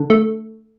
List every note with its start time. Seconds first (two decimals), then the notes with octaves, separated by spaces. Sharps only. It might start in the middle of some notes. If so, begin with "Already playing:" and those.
Already playing: D3
0.10 A3